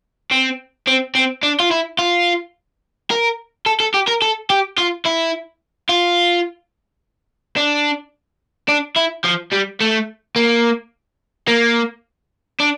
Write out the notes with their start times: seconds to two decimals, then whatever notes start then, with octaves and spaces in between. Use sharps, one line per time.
0.31 C4
0.88 C4
1.15 C4
1.43 D4
1.60 F4
1.71 E4
1.99 F4
3.11 A#4
3.66 A4
3.80 A4
3.94 G4
4.08 A#4
4.22 A4
4.50 G4
4.78 F4
5.06 E4
5.89 F4
7.57 D4
8.69 D4
8.96 E4
9.25 F3
9.52 G3
9.81 A3
10.36 A#3
11.48 A#3
12.60 D4